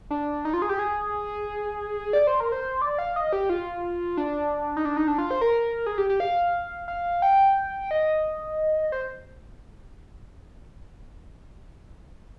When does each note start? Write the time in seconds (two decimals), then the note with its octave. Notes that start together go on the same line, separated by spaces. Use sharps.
0.10 D4
0.45 D#4
0.54 F4
0.62 G#4
0.69 G4
0.79 G#4
2.13 D5
2.27 C5
2.40 A#4
2.52 C5
2.82 D5
2.99 F5
3.16 D#5
3.33 G4
3.49 F4
4.17 D4
4.77 D#4
4.85 D4
4.97 D#4
5.08 D4
5.18 F4
5.31 C5
5.41 A#4
5.86 G#4
5.98 G4
6.09 G4
6.20 F5
6.88 F5
7.22 G5
7.91 D#5
8.92 C5